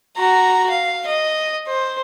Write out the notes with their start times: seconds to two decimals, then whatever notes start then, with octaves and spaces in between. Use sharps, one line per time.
0.17 F#4 A#5
0.70 F5
1.07 D#5
1.67 C5